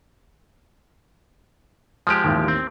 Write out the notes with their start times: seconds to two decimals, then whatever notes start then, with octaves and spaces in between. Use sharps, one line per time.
2.07 F3 G#3 G4 D#6 D7
2.24 A1 D#2
2.48 C4